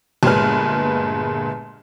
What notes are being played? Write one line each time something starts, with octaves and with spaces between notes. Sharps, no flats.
G1 A#2 G#3 B4 F6